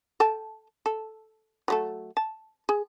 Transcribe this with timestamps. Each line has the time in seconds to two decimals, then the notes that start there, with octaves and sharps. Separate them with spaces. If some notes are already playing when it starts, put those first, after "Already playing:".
0.20 A4 G5 A5
0.86 A4
1.68 F#3 A3 A4
2.17 A5
2.69 G#4